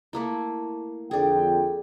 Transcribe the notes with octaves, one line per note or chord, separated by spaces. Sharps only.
A3 A#3 E4
F2 D3 G#4 D5 G5